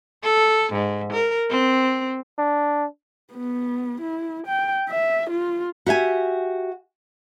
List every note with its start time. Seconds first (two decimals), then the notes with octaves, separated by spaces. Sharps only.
0.23 A4
0.73 G#2
1.13 A#4
1.50 C4
2.38 D4
3.33 B3
4.01 E4
4.47 G5
4.90 E5
5.30 F4
5.86 F#4 G4 E5 G#5